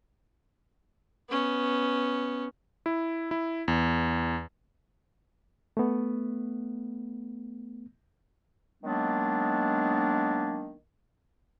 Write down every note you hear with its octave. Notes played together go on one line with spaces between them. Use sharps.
B3 C#4
E4
E4
E2
A3 B3
D#3 F#3 G#3 A#3 B3 D4